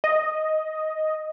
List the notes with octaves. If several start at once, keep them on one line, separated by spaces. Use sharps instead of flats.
D#5